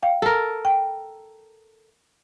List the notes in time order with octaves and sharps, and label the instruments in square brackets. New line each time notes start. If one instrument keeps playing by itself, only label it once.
[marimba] F5 G5
[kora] A4 A#4
[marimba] G5